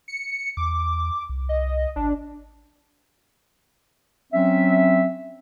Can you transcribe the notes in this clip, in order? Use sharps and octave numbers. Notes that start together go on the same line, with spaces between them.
C#7
E2 D6
C2
D#5
G#1 D4
F#3 C4 C#4 E5